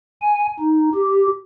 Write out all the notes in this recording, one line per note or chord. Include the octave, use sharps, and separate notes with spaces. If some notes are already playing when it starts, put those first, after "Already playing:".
G#5
D#4
G4